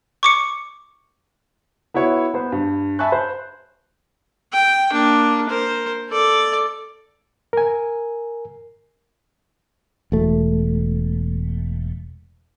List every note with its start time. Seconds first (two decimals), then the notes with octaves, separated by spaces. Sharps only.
0.23 C#6 D6 C#7
1.94 B3 E4 F#4 C#5
2.34 B3 C5
2.52 G2
2.99 E5 G#5 A5 B5 C#6 F#6
3.12 C5
4.52 G5
4.92 A#3 D4
5.49 A#4 C5
6.09 A4 D5
7.53 A#4 G#5
10.12 E1 A3